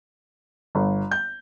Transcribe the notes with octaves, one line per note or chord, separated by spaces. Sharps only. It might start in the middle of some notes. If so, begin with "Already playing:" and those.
G1
G6